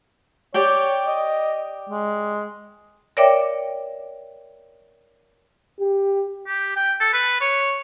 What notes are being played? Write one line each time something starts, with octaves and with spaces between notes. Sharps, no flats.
G4 C#5 D5 G5
D#5
G#3
A#4 C#5 D5 E5 G5 D6
G4
G4
G5
A4
B4
C#5